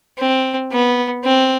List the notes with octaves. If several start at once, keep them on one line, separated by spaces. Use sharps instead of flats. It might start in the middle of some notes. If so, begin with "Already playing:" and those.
C4
B3
C4